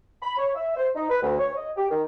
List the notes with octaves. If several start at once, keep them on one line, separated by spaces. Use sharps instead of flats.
B5
C#5
E5
C5
D#4
B4
D2
C#5
D#5
G4
D#3